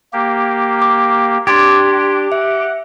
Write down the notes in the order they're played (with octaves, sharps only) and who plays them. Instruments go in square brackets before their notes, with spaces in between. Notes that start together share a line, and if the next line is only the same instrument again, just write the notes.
[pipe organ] A#3 G4
[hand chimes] D6
[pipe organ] D4 [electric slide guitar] G4 [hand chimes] C6 G#6 A6
[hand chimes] E5 [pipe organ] F#5